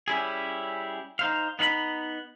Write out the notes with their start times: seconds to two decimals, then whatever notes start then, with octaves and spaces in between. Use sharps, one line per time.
0.08 G3 C#4 E4 G#4
1.19 D#4 C5 F5
1.59 B3 D#4 F5 B5